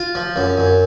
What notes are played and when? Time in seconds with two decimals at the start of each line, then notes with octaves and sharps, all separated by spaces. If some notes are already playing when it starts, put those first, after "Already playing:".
Already playing: F4
0.15 F3
0.36 F#2
0.58 F#2